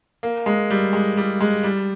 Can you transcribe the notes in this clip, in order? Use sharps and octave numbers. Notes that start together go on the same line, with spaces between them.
A#3
G#3
G3
G#3
G3
G#3
G3